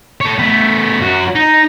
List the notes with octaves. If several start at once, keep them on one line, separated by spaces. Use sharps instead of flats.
A4 C#5
A3 B3
F#2 F#4
D#4